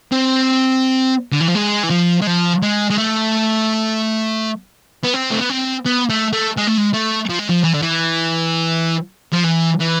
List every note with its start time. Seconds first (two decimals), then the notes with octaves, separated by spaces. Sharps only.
0.12 C4
1.32 D3
1.40 E3
1.48 F3
1.55 G#3
1.83 E3
1.90 F3
2.22 G#3
2.27 F3
2.63 G#3
2.90 G#3
2.98 A3
5.04 B3
5.14 C4
5.31 A3
5.41 B3
5.49 C4
5.86 B3
6.10 A3
6.33 A3
6.57 G#3
6.67 A3
6.78 G#3
6.93 A3
7.29 F3
7.39 G#3
7.49 F3
7.64 E3
7.74 D3
7.82 E3
9.33 F3
9.44 E3
9.80 E3